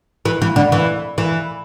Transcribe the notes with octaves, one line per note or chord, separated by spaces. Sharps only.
E3
E3
D3
E3
E3